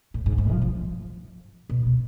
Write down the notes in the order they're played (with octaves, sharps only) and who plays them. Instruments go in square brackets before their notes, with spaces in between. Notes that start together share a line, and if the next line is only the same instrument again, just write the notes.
[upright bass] A2
G#2
G#2
F3
F3
B2
B2